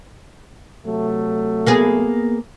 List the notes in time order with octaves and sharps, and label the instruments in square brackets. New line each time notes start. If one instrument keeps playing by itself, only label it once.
[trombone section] C3 F#3 A3
[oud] A#3 B3 G#4